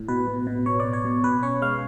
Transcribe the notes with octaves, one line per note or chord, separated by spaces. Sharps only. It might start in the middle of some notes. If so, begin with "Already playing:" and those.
Already playing: A2
B2 B4
B2
B2
B2 C#5
B2 D5
C#5
B2
B2 B4
C#4 C#5
G#3 F5